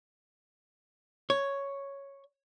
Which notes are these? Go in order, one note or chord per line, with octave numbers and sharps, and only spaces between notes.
C#5